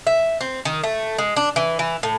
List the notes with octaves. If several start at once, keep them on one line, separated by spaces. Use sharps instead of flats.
E5
C4
D#3
A3
G#3
D4
E3
E3
A2